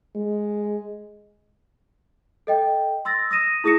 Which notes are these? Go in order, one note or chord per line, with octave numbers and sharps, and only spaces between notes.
G#3
A4 D#5 G5
C6 E6 A6 A#6
D#6 A#6 D#7 E7
E4 G#4 D#6 A#6 C#7 E7